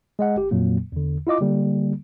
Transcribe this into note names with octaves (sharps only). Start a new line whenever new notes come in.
G#3 D#5 F#5
G1 G4
F2 A#2 F#3 A#3
E2 D3
E4 F4 D#5 D6
D3 G3 A#3